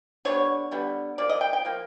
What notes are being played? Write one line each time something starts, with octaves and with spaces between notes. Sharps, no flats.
D3 G3 B3 C#5
D3 G3 B3
F3 A#3 D5
D#5
G5
G5
F3 A#3